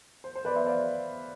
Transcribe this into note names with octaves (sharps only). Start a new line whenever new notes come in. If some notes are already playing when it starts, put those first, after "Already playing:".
C5
C5
B4 D5
C5 E5
D5 F5